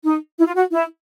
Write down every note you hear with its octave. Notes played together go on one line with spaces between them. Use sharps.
D#4
E4
F4
F#4
E4